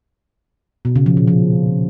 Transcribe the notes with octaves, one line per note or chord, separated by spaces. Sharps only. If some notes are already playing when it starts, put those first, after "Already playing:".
B2
C#3
F3
A#2
F3